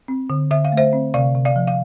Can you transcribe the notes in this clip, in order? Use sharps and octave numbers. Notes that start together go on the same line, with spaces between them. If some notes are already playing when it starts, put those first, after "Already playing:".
C4
D3
D3 E5
F5
A3
C5 E5
C4
C3 D5 F5
C3
D5 F5
F3
F5